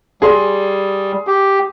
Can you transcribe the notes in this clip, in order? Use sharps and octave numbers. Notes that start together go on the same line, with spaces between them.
G3 G#4 C6
G4